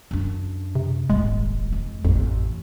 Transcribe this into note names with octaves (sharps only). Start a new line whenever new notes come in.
F#2 D4
C3
D#1 G#1 G#3
F2
A1 F2